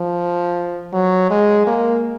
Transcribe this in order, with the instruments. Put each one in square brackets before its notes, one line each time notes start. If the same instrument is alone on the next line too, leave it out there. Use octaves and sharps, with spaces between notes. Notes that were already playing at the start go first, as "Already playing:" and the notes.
Already playing: [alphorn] F3
F#3
G#3
A#3